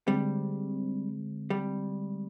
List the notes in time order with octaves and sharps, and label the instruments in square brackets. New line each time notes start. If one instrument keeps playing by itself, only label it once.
[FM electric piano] D3 G#3 C4 [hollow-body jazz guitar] G3
[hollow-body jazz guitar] G3